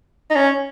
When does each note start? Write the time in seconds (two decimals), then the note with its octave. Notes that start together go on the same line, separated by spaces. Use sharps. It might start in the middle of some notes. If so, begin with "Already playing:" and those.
0.31 D#4
0.36 C#4